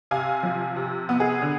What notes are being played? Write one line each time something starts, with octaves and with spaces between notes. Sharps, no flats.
C3 F5 G#5
F3
C3
B3
G#4
D3